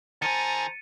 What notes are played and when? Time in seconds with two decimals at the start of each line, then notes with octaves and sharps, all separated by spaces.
0.22 D#3 G#4 C5 A5 A#5 A6 C#7 D#7